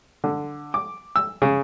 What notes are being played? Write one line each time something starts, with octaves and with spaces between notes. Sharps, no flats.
D3
D6
E6
C#3